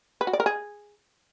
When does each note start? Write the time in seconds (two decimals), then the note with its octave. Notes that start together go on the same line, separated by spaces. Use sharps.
0.21 B4
0.27 F#4
0.33 D5
0.40 A#4
0.46 G#4